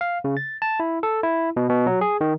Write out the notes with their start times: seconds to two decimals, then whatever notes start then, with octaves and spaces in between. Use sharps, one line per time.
0.01 F5
0.24 C#3
0.37 A6
0.62 A5
0.80 E4
1.03 A4
1.23 E4
1.57 B2
1.69 B2
1.87 F#3
2.01 G#4
2.21 D#3